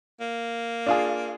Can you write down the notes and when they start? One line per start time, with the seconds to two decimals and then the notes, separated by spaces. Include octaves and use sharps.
0.20 A#3
0.86 D4 F4 G#4